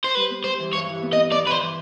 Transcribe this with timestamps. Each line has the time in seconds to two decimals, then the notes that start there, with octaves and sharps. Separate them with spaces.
0.04 C5
0.15 G3 B4
0.31 B3
0.44 G3 C5
0.59 E3
0.73 G2 C#5
0.89 E3
1.03 B3
1.13 D#5
1.17 B3
1.31 B3 D5
1.46 E3 B4
1.51 C5
1.60 E3